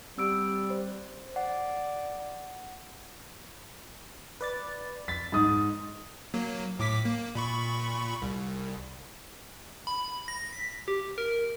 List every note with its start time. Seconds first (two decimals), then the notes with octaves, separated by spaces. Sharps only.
0.18 G3 C4 E6 D7
0.70 C5
1.36 D5 F#5
4.41 B4 D5 A6
5.08 F2 A6 B6
5.32 G#2 D#6
6.34 F#3 A#3
6.79 A2 D6 B6
7.05 A#3
7.35 A#2 B5 C#6
8.22 C2
9.87 B5
10.28 A#6
10.53 B6
10.88 G4
11.18 A#4